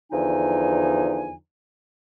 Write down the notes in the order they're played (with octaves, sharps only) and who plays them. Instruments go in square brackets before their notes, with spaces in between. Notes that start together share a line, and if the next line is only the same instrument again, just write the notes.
[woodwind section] E2 D3 F3 D#4 G#5